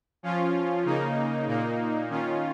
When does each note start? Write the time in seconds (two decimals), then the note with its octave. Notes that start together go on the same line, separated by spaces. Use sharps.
0.23 F3 C#4 F4
0.84 C#3 A#3 D#4
1.47 A#2 A#3 D#4
2.09 D#3 C#4 F4